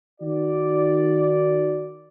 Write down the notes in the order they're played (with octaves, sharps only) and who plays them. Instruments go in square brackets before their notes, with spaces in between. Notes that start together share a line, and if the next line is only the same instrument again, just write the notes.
[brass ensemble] D#3 F#4 D5